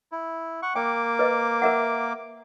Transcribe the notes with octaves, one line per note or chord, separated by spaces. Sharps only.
E4
F#5 C#6
A#3 G5 D6
B4 D#5
A#4 E5 F#5